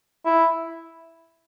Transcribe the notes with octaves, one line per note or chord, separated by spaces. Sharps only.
E4